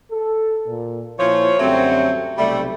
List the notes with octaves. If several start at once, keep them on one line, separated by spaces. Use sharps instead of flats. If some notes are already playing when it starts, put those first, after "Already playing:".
A4
A#2
A#2 F3 E4 C#5
F#2 D3 F#3 G3 A3 C4
B1 C3 G3 A3